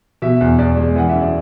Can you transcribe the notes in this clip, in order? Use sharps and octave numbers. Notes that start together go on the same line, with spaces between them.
B2 E5
E2
E2 D5
G#3
E3 F#5
F#2 E5
D5